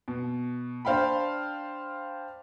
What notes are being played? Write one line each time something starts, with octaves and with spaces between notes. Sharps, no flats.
B2
D4 C5 F5 G5 B5